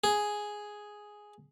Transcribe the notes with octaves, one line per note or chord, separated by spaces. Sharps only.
G#4